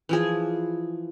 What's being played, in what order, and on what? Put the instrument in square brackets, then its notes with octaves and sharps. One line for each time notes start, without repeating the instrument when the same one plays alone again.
[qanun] E3 F3 G#4